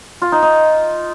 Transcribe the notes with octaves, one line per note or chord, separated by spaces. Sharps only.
F4
D#4
D#4